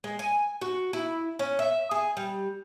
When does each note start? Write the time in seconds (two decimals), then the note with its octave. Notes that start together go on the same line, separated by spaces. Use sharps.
0.04 G#3
0.19 G#5
0.61 F#4
0.93 E4
1.39 C#4
1.59 E5
1.91 G#4
2.17 G3